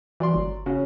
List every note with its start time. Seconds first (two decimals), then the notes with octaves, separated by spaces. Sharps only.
0.20 E3 F#3 D5 C6
0.34 G1
0.66 C#3 C#4 F#4